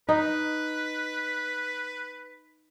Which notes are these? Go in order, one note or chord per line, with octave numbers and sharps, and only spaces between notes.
D#4 B4